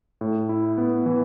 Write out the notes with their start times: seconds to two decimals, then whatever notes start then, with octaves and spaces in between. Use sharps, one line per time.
0.21 A2
0.49 E4
0.78 B3
1.06 E3